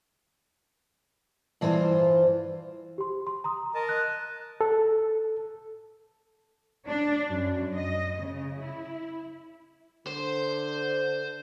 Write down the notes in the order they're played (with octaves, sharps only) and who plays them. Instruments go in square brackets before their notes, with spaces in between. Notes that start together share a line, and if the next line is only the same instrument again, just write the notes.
[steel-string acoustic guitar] G2 E3 F4 A#4 C5
[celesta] G4 C6
C6
A#5 C6 D#6
[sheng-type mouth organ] A#4 D#5 A5
[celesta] F#6
[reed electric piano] A4
[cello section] D4
F#2
D#5
C#3
E4
[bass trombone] D3 [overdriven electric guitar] C5